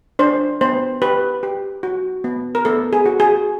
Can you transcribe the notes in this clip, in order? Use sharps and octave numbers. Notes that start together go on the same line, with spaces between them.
D4 C5
B3 C5
G4 B4
G4
F#4
B3
A#4
B3 A4
G#4
F#4
G#4